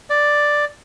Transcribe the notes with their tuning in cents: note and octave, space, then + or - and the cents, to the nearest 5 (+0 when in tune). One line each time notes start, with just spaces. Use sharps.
D5 +5